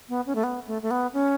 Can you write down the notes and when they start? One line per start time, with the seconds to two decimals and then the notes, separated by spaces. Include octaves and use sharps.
0.09 B3
0.26 C#4
0.35 A3
0.44 B3
0.67 A3
0.82 A3
0.91 B3
1.13 C#4